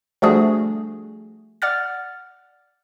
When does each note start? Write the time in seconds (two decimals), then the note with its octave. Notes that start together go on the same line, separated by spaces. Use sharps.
0.22 F3 G3 A3 D4 F#4 G#4
1.62 D5 F#5 F6 A6